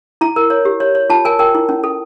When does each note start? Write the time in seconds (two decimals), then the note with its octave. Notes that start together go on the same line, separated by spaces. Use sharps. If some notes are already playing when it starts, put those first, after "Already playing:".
0.21 E4 A#5
0.36 A#4
0.50 C#5
0.65 G4
0.80 C#5
0.95 C#5
1.10 F4 A5
1.25 A#4 G#5
1.39 A#4 G5
1.55 E4
1.69 C#4
1.84 A4